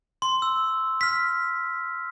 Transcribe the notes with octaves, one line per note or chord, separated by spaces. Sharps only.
C6
E6
F6 B6